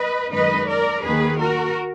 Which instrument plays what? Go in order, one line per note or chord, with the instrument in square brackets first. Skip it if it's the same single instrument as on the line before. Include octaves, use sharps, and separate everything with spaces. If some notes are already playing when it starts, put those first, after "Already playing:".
Already playing: [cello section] B4 D#5
F#2 D#3 G#3 D#4 B4 D#5
A#4 D5
D#2 D#3 A#3 G#4 B4
F#4 A#4